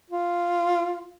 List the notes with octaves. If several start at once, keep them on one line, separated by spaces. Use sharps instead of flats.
F4